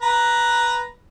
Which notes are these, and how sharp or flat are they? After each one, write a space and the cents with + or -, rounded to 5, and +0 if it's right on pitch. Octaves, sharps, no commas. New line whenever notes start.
B4 -5 A#5 +5